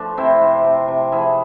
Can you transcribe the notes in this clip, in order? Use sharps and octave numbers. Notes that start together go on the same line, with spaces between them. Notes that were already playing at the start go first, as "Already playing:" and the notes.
Already playing: F3 A3 D4
C3 C4 E4
C3
C3
C3
F3 E4 G#4